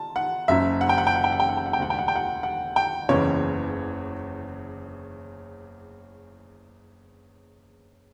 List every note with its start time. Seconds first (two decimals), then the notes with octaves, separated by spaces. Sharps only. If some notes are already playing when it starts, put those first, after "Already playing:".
Already playing: A5
0.16 F#5
0.48 F#1 F#2 C#3 E5
0.81 F#5
0.89 G5
0.98 F#5
1.07 G5
1.16 F#5
1.24 G5
1.32 F#5
1.40 G5
1.49 F#5
1.57 G5
1.66 F#5
1.73 G5
1.79 E1 D2 D3 F#5
1.90 G5
1.99 F#5
2.08 G5
2.15 F#5
2.43 F#5
2.76 G5
3.09 F#1 E2 C#3 E3 C#5